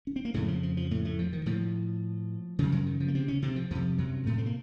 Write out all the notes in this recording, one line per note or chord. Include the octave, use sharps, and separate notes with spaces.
C#4
C4
A#3
F2 A2 C#3 A3
F3
F3
F3
A2 A3
A2 A3
F3
D#3
A2 F3
F#2 C#3 F3
F#2 F#3
D#3
F3
A#3
C3 C4
C#3 C#4
C3 C4
F3
F2 C3 F3
F#2 F#3
A2 A3
C4
A#3